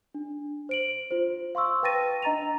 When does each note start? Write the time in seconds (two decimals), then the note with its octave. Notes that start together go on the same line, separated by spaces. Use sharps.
0.15 D4
0.69 C5 D7 F#7
1.11 F4 C5
1.55 F5 C6 C#6 E6
1.83 B4 G5 A5 A6 A#6 D#7
2.22 D4 D#5 A#5 A6 D#7 F7